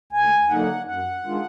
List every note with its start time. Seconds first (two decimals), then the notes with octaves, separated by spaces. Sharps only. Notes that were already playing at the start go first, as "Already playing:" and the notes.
0.13 D2 G#5
0.49 D3 F#3 A#3 D#4 F#5
0.86 F#2 F#5
1.24 D#3 G#3 D4 F4